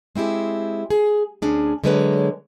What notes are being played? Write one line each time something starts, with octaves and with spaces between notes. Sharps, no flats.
G#3 C4 E4 G4 G#4
G#4
D2 C#4 D4 G#4
D3 F#3 G#3 A#3 B4 C#5